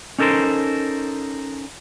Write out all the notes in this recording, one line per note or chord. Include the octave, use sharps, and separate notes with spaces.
C#4 D#4 A4 A#4 C5